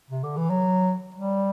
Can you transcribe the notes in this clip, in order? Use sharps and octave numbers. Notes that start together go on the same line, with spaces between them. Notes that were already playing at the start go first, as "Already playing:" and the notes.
C3
D3
E3
F#3
G3